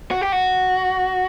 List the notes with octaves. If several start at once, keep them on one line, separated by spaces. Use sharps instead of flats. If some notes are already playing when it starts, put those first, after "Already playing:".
F#4
G4
F#4